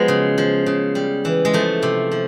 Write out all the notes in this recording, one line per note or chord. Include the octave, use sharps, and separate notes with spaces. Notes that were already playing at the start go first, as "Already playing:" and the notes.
Already playing: F3 F#3 G#3 B3
C#3
F3
C#3
G3
E3
G#3
F3 A3
C3
F3